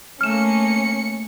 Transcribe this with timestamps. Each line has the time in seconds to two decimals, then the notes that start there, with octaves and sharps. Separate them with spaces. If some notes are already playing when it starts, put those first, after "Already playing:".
0.21 A3 A#3 C#4 F6 C#7 E7